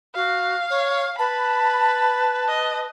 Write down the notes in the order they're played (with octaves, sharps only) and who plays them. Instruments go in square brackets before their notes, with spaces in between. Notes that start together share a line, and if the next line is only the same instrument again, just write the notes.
[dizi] F#4 [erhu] F5
[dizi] C#5
[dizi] B4 [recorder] A5 [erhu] B5
[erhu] D#5